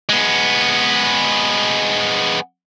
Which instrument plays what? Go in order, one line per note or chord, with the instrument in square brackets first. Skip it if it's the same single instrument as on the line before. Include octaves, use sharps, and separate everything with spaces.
[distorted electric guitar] G#3 B3